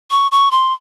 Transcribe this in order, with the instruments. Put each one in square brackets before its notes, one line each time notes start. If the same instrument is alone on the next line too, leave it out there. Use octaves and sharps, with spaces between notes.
[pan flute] C#6
C#6
C6